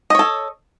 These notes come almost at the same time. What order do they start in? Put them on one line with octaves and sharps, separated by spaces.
D#5 C#5 A4